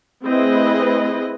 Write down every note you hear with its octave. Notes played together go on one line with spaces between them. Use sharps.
A3 C4 E4 G#4 B4 D#5